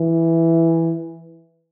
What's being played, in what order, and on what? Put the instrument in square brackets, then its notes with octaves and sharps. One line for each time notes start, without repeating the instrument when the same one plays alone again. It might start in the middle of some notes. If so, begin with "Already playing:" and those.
Already playing: [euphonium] E3